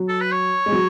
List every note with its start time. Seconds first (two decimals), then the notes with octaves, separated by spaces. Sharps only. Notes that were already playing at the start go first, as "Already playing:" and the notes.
Already playing: F#3
0.08 A4
0.20 B4
0.32 C#5
0.66 G#3
0.72 F#3